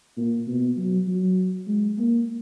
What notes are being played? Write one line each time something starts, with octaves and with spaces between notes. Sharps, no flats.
A#2
B2
F#3
F#3
G#3
A#3